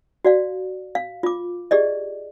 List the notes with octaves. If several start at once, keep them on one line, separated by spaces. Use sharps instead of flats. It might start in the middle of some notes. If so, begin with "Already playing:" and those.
F#4 D5 F5
F5
F4 D6
G4 G#4 D5 D#5